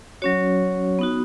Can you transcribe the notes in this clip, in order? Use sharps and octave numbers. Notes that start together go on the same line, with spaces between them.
F#3 C#4 F#4 C#5
B3 D#4 F#4